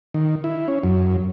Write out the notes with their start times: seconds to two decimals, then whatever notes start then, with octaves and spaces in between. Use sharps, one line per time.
0.14 D#3
0.44 E4
0.68 C#4
0.83 F#2